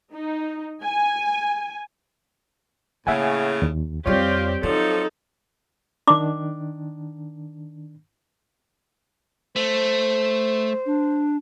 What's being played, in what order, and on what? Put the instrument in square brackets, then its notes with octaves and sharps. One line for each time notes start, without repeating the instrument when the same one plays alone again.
[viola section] D#4
G#5
[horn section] A2 C#3 [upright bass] A#3 [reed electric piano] E5 F#5 G#5
[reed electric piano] D#2
[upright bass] F2 G3 [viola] C4 G4 [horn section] F4 [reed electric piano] C#5 D5
[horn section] F3 F#3 [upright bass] C4 [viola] D#4 A4
[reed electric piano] D#3 D4 [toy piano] D6
[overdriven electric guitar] A3 [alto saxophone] C5
[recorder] D4